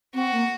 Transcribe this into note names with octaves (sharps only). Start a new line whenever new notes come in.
C4 F#4
A#3